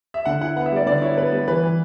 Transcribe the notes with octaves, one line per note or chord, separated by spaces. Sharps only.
E5
D3 F#5
E4 F#5
B3 F#5
E5
G3 D5
D3 D5
E4 C#5
B3 B4
G3
E3 B4
E3